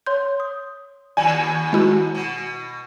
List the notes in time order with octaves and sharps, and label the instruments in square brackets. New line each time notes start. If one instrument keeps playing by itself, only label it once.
[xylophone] C#5 C6 G6
D#6
[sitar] D#2 F#3 [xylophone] D5 [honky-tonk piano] G#5
[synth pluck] G#3 E4 F#4
[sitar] B2